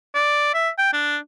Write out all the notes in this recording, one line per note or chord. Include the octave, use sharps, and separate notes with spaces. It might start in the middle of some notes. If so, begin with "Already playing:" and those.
D5
E5
G5
D4